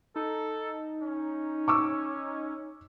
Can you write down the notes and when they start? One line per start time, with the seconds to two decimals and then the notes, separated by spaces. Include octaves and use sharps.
0.16 D#4 A4
1.02 C#4
1.68 C#6 D6 E6